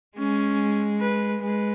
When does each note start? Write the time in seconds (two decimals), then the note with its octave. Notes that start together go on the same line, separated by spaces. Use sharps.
0.17 G#3 C#4
1.01 B4
1.42 G#3 B4